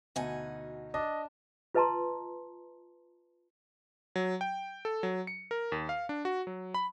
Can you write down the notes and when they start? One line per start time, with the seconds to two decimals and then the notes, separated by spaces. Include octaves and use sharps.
0.16 D2 B2 D#4 F#4 G#5 A5
0.94 D4 D#5
1.75 F4 B4 D#5 A5 A#5 C6
4.16 F#3
4.41 G5
4.85 A4
5.03 F#3
5.27 C#7
5.51 A#4
5.72 D#2
5.89 F5
6.09 D4
6.25 F#4
6.47 F#3
6.74 B5